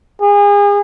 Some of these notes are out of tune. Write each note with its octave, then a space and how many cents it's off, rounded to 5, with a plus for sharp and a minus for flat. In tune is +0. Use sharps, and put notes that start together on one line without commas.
G#4 -35